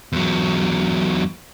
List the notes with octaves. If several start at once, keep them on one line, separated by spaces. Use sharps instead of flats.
E2 F#3